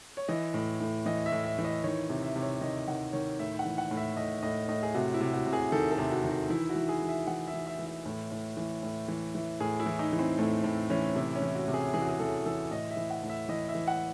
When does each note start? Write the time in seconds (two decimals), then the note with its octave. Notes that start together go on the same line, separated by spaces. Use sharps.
0.17 C#5
0.28 E3 D#5
0.54 A2
0.80 A2
1.06 E3 D#5
1.26 E5
1.32 A2
1.45 E5
1.59 E3
1.65 D#5
1.84 D#3 C#5
2.10 C3
2.23 E5
2.36 C3
2.42 C#5
2.61 D#3 D#5
2.87 D#3 F#5
3.13 D#3 C#5
3.39 A2 E5
3.59 F#5
3.65 E3
3.78 F#5
3.91 A2
3.97 E5
4.17 A2 D#5
4.43 A2 D#5
4.68 A2 D#5
4.83 G#4
4.95 C3 F#4
5.14 E4
5.21 C3
5.33 F#4
5.46 C3
5.53 G#4
5.72 D#3 A4
5.92 A4
5.98 C3
6.11 F#4
6.24 D#3
6.30 F#4
6.50 E3 E4
6.70 F#4
6.76 E3
6.89 G#4
7.02 E3
7.09 E5
7.27 E3 F#5
7.48 E5
7.54 E3
7.67 E5
7.79 E3
7.86 E5
8.06 A2
8.32 A2
8.57 E3
8.83 A2
9.08 E3
9.35 E3
9.60 A2 G#4
9.80 E4
9.86 E3
9.99 D#4
10.13 E3
10.19 C4
10.38 A2 A3
10.64 A2
10.90 E3 C#4
11.15 C3 E4
11.36 C#4
11.42 E3
11.55 F#4
11.68 C3
11.74 G#4
11.94 E3 G#4
12.01 F#4
12.09 G#4
12.19 E3 A4
12.46 E3 A4
12.71 A2 D#5
12.91 E5
12.97 E3
13.10 F#5
13.23 A2
13.30 E5
13.49 E3 D#5
13.69 E5
13.75 E3
13.87 F#5